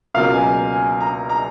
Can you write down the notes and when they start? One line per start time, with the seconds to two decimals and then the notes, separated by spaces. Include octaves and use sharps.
0.14 C#2 B2 F#3 A#3 F5
0.34 G#5
0.73 G#5
1.00 A#5
1.29 A#5